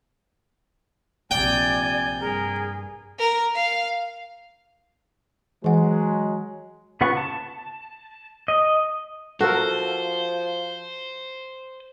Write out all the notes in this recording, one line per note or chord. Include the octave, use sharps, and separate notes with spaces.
A#1 C3 D5 G5 G#5
G2 G#4 A#4
A#4
F5
E3 F#3 G#3 F#5
C#3 B3 F4 F#5 C#6
A5
D#5
F3 F#4 A4 A#4 C5